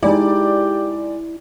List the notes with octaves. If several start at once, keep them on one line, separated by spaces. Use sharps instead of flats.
G#3 D#4 E4 G4 D5